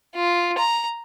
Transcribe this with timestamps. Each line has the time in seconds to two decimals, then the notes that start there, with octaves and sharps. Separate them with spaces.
0.16 F4
0.58 A#5